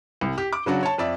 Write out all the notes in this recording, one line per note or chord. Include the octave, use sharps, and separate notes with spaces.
C2
G4
D6
C#3 F#3 D4 F#4
C#5 A5
F2 D5 E5